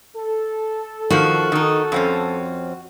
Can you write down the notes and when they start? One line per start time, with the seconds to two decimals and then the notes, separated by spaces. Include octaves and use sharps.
0.16 A4
1.10 D#3 F3 F#4
1.52 D#3 D#4
1.92 F2 C4 C#4